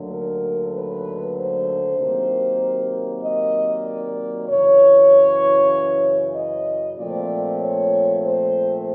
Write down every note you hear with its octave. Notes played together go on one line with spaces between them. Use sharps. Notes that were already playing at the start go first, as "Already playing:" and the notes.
Already playing: D#2 D3 F#3 A3
A#4
B4
C5
C3 D#3 F#3 A#3
D#5
D5
F#2 C#3 E3 C#5
D#5
A#2 F3 A3 C4 D5
C#5
C5